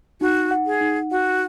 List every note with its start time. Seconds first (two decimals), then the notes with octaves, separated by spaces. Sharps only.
0.21 D#4 F#4
0.51 F#5
0.66 G#4
0.81 D#4
1.11 F#4 F#5